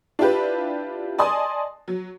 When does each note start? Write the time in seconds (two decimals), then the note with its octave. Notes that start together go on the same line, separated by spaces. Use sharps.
0.19 D4 E4 F4 G4 B4
1.18 D5 D#5 G#5 A5 C6 D#6
1.88 F#3